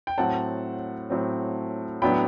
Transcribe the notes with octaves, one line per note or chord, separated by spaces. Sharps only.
G5
A2 F#3 C4 F#5 A5
A2 F#3 C4
A2 F#3 B3 D4 G5 B5